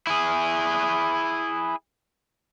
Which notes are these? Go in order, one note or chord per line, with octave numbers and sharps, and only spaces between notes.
E4 G#4